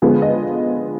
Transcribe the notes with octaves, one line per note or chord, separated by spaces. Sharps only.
D3 F3 G#3 B3 G#4
D#5